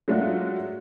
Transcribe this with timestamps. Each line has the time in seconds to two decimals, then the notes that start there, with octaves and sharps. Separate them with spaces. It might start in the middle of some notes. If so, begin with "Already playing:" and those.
0.08 F#3 G#3 A3 D4 F4 F#4